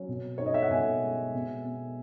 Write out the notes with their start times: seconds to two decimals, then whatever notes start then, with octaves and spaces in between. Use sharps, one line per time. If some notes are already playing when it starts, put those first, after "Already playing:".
Already playing: F#3 C#4
0.09 B2
0.38 D#4 C#5
0.46 D#5
0.54 E5
0.62 F#5
0.71 B2 E5 G#5
1.02 G#3
1.34 B2
1.64 B3